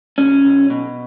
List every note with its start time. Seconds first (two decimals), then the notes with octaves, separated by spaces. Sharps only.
0.18 B1 C#4
0.45 B1
0.70 B2